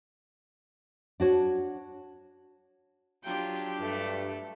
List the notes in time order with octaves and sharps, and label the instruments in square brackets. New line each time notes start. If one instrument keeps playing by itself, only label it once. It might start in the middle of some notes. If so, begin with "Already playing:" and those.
[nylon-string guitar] D4 F#4 C#5
[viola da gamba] F#3 D4 G4 [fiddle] F4 G5
[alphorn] G2 [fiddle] A3